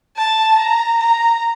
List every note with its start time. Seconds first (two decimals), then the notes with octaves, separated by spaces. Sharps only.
0.17 A5
0.59 A#5
1.00 A#5